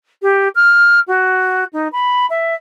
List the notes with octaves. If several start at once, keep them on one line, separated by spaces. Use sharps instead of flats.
G4
F6
F#4
D#4
B5
E5